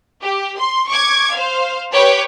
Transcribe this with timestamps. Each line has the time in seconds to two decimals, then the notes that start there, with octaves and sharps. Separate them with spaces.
0.23 G4
0.59 C6
0.89 C#6 D6 G#6
1.32 C5 F5
1.93 G4 B4 C#5 G5 D6